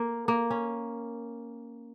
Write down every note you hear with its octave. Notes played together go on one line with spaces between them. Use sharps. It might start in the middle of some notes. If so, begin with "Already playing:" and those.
Already playing: A#3
A#3
C#4